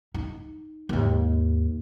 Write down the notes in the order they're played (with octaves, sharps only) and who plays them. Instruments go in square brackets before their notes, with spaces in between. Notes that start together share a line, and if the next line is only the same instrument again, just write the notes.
[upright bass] D#4
D#2 G#2